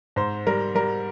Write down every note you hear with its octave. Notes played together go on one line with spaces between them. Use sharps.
G#2 C5
G3 A#4
G3 A#4